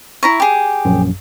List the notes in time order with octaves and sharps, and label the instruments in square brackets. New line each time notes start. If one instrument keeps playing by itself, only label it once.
[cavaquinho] E4 A#5 C#6
G4 G#4
[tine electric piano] A#1 F#2